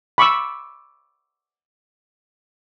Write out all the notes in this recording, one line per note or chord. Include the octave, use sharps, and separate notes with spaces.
B5 C#6 D6 E6